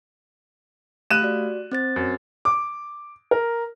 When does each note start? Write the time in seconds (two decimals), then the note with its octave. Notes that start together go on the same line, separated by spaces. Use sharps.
1.11 A3 G4 F5 F#6 D#7 E7
1.22 F#4 D5
1.71 C4 C5 A6
1.96 F#2
2.45 D6
3.31 A#4